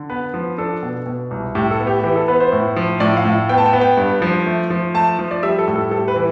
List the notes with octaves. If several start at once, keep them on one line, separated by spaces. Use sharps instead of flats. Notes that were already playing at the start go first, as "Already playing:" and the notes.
Already playing: D3
B3 B4
F3
D4 A4
B2
B2
C2
A2 G4
A4
B3
G4
E3 G4
A4
B3 B4
C5
A2
F3
A2 D5
F5
A2
B3 G5
A5
G5
B3
G5
G2
F3
A3
F3
A3 A5
F3
D5
G3 E5
A4
A2
A4
G3 A4
B4
E3